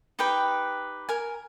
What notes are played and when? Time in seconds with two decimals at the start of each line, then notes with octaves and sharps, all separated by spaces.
0.19 D#4 G4 B4 G5
1.09 A#4 G#5